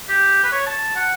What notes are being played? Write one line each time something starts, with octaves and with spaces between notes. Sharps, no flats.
G4
B4
C#5
A5
F#5